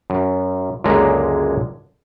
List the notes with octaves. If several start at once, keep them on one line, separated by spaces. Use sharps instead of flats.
F#2
C#2 F#2 D3 G#3 A#3 A#5